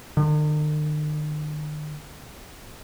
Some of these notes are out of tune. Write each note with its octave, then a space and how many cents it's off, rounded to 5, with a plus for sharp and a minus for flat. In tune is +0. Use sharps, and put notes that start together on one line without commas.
D#3 -45